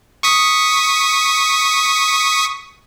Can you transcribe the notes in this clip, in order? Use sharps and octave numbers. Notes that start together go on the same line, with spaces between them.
C#6 D#6 B6